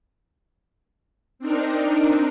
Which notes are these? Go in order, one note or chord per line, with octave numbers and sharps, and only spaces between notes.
C4 D4 D#4 A#4